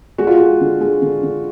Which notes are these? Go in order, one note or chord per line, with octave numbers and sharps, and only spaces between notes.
G#3 F#4
F4
G#3 F#4
D3
G#3
D3
D3